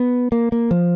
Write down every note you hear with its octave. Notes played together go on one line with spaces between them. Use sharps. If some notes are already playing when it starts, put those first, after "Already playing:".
Already playing: B3
A#3
A#3
F3